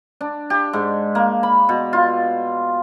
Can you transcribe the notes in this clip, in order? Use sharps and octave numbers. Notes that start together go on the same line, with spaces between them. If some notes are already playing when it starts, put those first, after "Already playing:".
D4
G4
G#2
A#3
B5
B2
F4